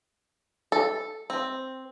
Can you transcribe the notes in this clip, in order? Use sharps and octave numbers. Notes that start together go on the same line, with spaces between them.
A4
C4